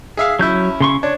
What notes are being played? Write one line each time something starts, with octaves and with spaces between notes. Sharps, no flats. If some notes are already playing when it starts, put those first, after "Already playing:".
G#4 E5 F5
F#3 C#4 E4 G6
C#3 C6 C#6
D4 C#5